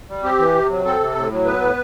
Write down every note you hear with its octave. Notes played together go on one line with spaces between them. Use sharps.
G3
C4 G4
E3
C3
F#3
C4 A4
C3
A2
F#3
B3 B4
A2